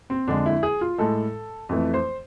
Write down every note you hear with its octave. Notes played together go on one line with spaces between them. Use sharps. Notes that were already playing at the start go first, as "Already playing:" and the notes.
C4
F2 D3 G#3 D4
E4
G#4
F4
A2 G#3 A4
F2 E3 A3
C5